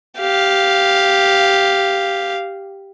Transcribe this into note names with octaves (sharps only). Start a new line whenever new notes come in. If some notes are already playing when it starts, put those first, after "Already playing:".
G4 F5